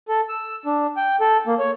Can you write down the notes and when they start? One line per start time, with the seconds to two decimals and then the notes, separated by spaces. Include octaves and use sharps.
0.08 A4
0.29 E6
0.66 D4
0.97 G5
1.20 A4
1.47 A#3
1.59 C#5